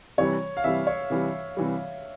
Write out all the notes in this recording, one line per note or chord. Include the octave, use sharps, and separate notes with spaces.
C3 E3 G3 C#5
F5
C3 E3 G3 E5
C#5
C3 E3 G3
C3 E3 G3